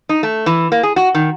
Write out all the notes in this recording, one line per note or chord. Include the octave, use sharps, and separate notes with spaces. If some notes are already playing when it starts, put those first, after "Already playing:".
D#4
A3
E3
A#3
G#4
F#4
D#3